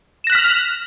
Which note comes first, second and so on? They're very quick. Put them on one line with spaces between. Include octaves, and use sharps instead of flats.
E7 A#6 F#6 B6 F6